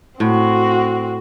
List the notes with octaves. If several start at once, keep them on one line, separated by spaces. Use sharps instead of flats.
A2 C4 F#4